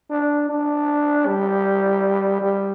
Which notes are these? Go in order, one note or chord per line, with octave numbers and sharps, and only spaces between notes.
D4
D4
G3
G3